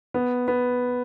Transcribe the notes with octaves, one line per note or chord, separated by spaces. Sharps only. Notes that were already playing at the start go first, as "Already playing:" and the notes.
B3
B3